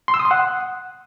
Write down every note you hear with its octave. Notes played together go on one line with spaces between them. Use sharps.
C6
E6
D#6
C6
F#5